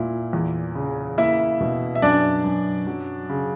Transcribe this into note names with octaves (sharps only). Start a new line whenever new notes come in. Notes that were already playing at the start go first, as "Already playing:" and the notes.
Already playing: A#2 A#3 E4
E2
C#3
A#3 E4 E5
B2
E5
F#2 D4 D5
F#2
F#3
C#3